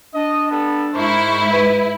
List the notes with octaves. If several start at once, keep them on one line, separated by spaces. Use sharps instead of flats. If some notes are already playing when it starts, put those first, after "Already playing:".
D4 D#5
G3 B3 A4
G#2 E4 A#4 C5 C#6
B4